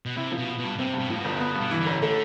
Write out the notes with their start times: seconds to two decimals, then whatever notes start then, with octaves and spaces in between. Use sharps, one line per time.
0.06 B2
0.16 C3 E4
0.32 F3
0.38 B2
0.47 B3
0.58 B2
0.64 G2
0.78 C3 C4
0.93 G2
0.99 B2
1.10 A2 F3
1.20 G1 B2
1.36 C3
1.40 B2 B3
1.55 G2
1.61 B2
1.71 E3
1.81 D3
1.86 A1
2.02 D3 A3